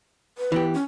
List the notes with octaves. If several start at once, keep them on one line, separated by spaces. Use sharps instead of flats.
B4
E3 B3 G4
C#4